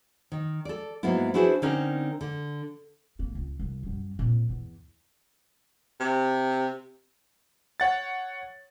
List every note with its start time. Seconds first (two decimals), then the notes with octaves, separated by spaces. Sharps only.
0.32 D#3
0.65 A4 D5
1.03 G#2 F#3 A#3 B3 E4
1.34 D4 E4 F#4 G#4 B4 C5
1.62 D3 C4 C#4 D#4 A#4
2.21 D3
3.19 G#1 A#3
3.35 C#2
3.59 C2
3.83 F#2 G3
4.19 F2 A#2
4.49 E2
6.00 C3
7.80 C#5 F#5 A6